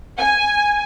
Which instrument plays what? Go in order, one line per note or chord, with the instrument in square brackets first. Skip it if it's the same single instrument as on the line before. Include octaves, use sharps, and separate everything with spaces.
[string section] G#5